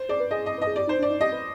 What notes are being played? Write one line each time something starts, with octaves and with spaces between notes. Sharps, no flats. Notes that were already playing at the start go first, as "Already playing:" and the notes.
Already playing: C5
G#4 D5
B4
G#4 D#5
D#5
B4 D#5
G#4
G4 D5
D#4 C5
D4
D5
D#4
G4 D#5
B4